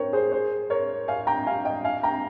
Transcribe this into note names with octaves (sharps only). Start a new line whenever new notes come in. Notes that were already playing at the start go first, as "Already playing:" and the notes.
Already playing: A#4 C5 C#5 G5
G#4 C5
G#4 C5
A#4 C#5
F5 G#5
G5 A#5
F5 G#5
D#5 G5
F5 G#5
G5 A#5